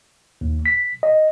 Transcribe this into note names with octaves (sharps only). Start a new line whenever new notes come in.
D#2
B6
D#5